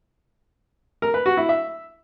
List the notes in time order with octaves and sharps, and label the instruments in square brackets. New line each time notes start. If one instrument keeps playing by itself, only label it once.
[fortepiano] A#4
B4
F#4
E4
E5